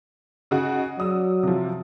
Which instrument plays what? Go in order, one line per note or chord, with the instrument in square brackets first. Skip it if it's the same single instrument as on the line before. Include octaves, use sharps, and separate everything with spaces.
[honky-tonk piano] C#3 D#4 F#4
[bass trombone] F#3 [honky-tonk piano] D5 D#6 E6
[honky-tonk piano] C3 F3